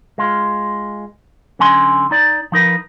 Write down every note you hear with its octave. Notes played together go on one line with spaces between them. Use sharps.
G#3 F4
D3 F#3 C#4 G#5 C6
D#4 D5
F3 D#4 A#4 B4